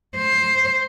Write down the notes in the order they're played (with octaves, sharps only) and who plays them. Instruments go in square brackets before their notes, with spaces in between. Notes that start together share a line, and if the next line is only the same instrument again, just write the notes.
[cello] C5